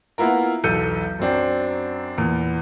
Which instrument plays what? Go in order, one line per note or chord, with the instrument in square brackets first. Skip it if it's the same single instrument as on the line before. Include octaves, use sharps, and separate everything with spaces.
[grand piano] A#3 B3 E4 F4 A#4
B1 E2 A4 G6 C#7 D#7
F#2 F#3 C4 D4
E2 A#2